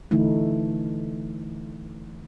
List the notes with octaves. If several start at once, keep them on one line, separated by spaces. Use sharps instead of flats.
D3 E3 A3 D#4 E4